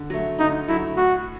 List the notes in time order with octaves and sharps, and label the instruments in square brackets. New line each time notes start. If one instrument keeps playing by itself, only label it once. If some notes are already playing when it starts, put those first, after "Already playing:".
Already playing: [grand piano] D3
F#3 A3
[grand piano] D3 [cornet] D#4
[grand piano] F#3 A3 [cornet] E4
[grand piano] A2 [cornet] F#4